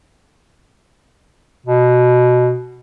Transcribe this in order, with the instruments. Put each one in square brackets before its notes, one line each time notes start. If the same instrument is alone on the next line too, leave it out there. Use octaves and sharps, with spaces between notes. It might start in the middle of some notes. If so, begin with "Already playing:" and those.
[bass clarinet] B2